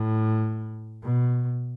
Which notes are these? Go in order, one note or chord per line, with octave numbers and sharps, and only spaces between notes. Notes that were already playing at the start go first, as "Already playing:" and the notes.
Already playing: A2
B2